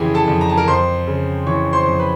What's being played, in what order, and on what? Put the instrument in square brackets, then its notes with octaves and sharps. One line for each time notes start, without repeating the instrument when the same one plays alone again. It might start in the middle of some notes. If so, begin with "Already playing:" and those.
Already playing: [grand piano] F2 C#3 E3 G4 G#4 G5 G#5
A4 A5
F2
A#5
A5
A#4 A#5
F2 C5 C6
C#3
E3 C#5 C#6
C5 C6
F2
B4 B5